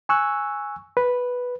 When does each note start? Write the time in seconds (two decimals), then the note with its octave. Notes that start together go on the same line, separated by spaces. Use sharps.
0.09 G#5 C#6 E6 F#6
0.97 B4